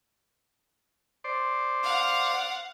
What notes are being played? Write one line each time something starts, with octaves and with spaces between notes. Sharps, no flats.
C5 D5
F5 F#5